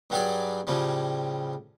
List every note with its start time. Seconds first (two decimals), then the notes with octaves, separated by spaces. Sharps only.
0.10 G2 F#3 G3 G4 G#4 D5
0.67 A2 C#3 F3 G3